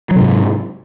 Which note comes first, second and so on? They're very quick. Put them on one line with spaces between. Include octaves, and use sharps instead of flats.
F#3 C3 G#2